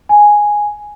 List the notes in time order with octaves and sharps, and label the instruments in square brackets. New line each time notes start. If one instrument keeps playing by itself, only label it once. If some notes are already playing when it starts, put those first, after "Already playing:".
[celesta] G#5